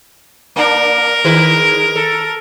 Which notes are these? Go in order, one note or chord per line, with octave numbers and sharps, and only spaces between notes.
A#3 D4 A#4
D#3 G#3 B4
A4